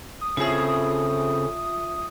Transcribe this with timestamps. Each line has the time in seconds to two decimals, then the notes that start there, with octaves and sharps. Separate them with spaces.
0.21 D#6
0.37 A2 C#3 C4 F4 G#4 E5